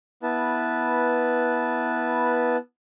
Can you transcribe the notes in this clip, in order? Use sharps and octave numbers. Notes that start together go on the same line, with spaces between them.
B3 E4 B4 A5